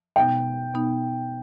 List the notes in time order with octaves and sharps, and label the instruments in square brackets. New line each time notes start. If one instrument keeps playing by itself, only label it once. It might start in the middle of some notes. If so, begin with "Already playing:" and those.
[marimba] B2 B3 D#4 [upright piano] G5
[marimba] B2 B3 D#4